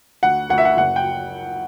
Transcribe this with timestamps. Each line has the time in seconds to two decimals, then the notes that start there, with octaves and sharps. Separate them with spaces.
0.22 D2 F#5
0.50 D2 F#5
0.58 E5
0.65 F#5
0.77 F#1 F#5
0.96 G5